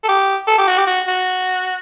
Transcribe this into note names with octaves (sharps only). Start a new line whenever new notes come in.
A4
G4
A4
G4
F#4
G4
F#4
F#4